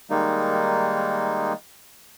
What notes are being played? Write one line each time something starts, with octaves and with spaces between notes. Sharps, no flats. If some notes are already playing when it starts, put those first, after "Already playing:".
D#3 G3 G#3 A#3 D#4